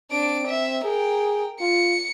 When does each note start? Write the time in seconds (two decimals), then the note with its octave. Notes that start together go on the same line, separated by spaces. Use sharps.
0.11 C4 D4 D7
0.47 E5
0.84 G#4 A#4 G5
1.61 F4 C#7